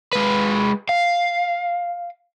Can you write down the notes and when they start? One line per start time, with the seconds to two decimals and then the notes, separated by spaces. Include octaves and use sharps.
0.13 G#3 B4
0.89 F5